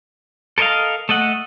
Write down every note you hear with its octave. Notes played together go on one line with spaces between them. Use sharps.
A4 A#4 C5 D#5 F5
A3 A4 D#5 F#5